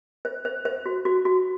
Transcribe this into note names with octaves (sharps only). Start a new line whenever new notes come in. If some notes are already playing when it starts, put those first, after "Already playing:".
C5
C5
C5
F#4
F#4
F#4